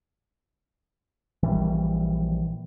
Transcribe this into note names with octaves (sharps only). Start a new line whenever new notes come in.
A#1 D#3 E3 G3